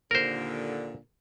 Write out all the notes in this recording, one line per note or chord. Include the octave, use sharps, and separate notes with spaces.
D#2 A#2 D3 A#4 C5